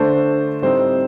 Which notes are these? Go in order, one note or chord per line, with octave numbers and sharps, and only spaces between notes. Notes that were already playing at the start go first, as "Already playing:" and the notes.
Already playing: D3 A3 D4 C5
A2 G3 C4 D#4 C5